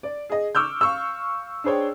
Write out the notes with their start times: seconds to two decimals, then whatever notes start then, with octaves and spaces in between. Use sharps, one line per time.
0.03 D5
0.29 G#4 D#5
0.55 C#6 D6 E6 F6 G6
0.81 F5 C#6 E6
1.64 D4 G#4 C5 C#5 G5